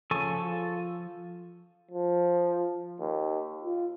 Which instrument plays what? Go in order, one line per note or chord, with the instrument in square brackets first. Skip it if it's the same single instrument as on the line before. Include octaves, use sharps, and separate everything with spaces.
[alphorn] C#3 [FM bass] F3 [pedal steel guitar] A4 G#5 C#6
[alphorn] F4
[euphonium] F3
D#2
F4